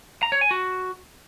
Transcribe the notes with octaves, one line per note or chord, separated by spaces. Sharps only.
A#5
C#5
G#5
F#4